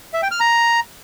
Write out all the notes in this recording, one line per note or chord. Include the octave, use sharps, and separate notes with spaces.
E5
G5
F6
A#5